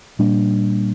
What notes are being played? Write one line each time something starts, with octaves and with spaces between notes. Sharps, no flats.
A#2 G3 A#3 D4